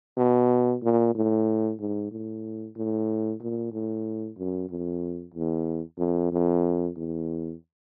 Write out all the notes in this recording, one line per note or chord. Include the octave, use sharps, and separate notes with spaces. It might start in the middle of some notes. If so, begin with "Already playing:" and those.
B2
A#2
A2
G#2
A2
A2
A#2
A2
F#2
F2
E2
F2
F2
E2